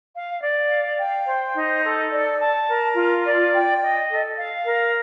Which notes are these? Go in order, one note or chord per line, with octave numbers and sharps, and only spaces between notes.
F5
D5
F5
G5
C5
D#4
A4
D5
A5
A#4
F4
D5
G5
D#5
A4
F5
A#4